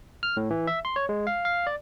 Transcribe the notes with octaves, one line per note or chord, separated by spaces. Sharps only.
F6
A2
E3
E5
C6
C#5
G#3
F5
F5
D5